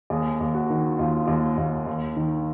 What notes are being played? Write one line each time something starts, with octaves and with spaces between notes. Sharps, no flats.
D#2 G#4
D#2
F#4
D#3
D#2 F4
D#2
D#2
D#2
D#3